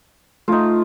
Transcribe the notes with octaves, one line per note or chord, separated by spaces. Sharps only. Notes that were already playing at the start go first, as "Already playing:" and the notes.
A3 D#4 F4